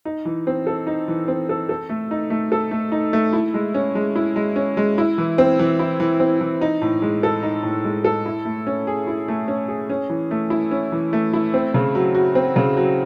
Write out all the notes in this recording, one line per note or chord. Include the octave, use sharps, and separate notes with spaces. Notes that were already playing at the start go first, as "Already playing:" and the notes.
D#4
E3
C4
A4
D#4
E3
C4
A4
A4
A3
D#4
A3
A4
A3
D#4
A3
E4
G#3
C#4
G#3
E4
G#3
C#4
G#3
E4
E3
C4
E3
E4
E3
C4
E3
D#4
A2
G#3
A4
D#4
A2
G#3
A4
E4
A3
C#4
G#4
E4
A3
C#4
G#4
C#4
E3
A3
E4
C#4
E3
A3
E4
C4
C#3
F#3
F#4
C4
C#3
F#3